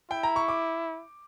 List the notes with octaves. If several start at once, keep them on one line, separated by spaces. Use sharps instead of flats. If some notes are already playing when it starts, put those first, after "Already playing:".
E4 G5
A#5
C#6
D6